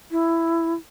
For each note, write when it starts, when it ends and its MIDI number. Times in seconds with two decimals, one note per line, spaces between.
0.11 0.74 64